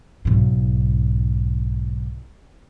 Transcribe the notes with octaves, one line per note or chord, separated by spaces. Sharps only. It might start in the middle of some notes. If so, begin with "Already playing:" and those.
B1 G#2